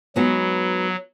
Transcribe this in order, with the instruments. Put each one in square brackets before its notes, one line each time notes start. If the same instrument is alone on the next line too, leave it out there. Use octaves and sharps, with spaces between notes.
[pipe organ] F#3 [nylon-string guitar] G#3 B3 D#4 F#4 B4